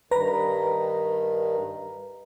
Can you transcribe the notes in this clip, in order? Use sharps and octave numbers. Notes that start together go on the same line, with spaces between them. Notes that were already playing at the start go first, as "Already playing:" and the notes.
G2 D#3 B4 A#5